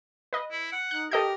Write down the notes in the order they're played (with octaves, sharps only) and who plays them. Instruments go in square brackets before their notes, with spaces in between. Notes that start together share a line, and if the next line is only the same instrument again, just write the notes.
[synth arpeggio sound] B4 D#5
[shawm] E4
F#5
[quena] D#4 [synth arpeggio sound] F#6
[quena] G4 [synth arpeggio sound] A4 D#5 G6 [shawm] A#4